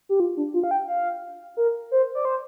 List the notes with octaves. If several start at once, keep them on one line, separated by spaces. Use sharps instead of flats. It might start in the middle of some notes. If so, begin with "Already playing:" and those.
G4
F4
D4
F4
F5
G5
F5
A#4
C5
D5
C5